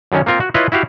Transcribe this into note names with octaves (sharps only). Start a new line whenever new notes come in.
F#2 D3 D#3 C#4
A#3 C4 F4 A#4
F#4
E4 F4 B4 C#5 D#5
E4 F#4 G4 F5